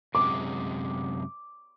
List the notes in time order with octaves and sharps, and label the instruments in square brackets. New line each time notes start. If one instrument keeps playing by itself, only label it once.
[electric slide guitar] F#2 C3 G#3 [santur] D6